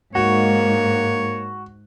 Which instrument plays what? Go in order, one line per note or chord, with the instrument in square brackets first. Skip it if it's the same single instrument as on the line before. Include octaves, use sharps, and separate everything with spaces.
[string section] G#2 [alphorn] A#3 [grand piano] F#4 [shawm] C#5